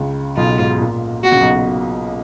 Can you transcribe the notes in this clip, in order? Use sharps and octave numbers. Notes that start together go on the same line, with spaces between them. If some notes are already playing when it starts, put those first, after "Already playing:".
Already playing: C#2 C#3
B1 B2 F4
G#2
A#2
B2 F#4
C#3
B1 B2